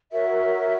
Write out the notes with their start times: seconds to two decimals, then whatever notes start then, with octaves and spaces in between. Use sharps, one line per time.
0.11 F#4 A#4 C#5 E5